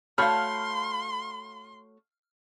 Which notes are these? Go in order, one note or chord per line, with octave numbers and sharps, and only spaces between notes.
A3 F#4 C#5 F5 B5 C6 F6 G6